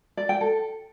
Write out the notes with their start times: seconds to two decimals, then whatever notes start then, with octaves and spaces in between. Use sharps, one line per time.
0.17 D5
0.29 G5
0.41 A4